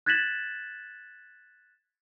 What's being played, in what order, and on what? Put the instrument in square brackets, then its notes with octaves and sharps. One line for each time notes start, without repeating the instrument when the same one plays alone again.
[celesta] F#6 G#6 A6 B6 E7 F#7